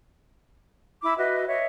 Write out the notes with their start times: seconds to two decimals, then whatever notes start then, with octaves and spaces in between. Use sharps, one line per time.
1.03 E4 B5 D6
1.18 F#4 B4 D#5 E5
1.48 C#5 D#5 E5